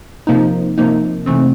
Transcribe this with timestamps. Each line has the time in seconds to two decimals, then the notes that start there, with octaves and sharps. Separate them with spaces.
0.27 C3 F3 A#3 D#4
0.78 C3 F3 A#3 D#4
1.26 C3 E3 A3 C4